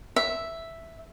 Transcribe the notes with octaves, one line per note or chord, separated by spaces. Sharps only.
E5